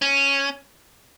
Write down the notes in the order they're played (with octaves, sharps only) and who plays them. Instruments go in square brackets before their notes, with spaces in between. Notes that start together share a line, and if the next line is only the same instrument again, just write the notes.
[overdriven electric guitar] C#4